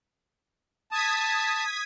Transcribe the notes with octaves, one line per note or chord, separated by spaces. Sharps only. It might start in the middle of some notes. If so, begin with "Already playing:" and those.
A5 D#6 G#6 B6